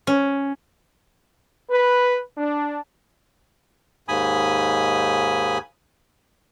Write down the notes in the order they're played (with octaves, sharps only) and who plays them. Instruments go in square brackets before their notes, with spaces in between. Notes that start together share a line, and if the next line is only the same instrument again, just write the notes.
[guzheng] C#4
[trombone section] B4
D4
[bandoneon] D#2 G#2 G#5 B5 D#6